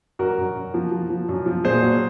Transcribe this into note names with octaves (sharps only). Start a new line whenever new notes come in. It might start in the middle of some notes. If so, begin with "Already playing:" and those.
F#2 F#4 A#4
F#2
F#2
F3
F3
F3
F#2
F3
A#2 G#4 C5
F#3